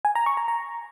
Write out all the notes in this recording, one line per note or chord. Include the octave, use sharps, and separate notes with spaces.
G#5
A#5
C#6
A#5
A#5